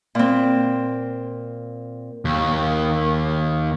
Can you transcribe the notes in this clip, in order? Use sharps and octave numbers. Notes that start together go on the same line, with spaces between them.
A#2 C4
D#2